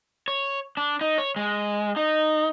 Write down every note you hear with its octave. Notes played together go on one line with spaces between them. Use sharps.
C#5
D4
D#4
C#5
G#3
D#4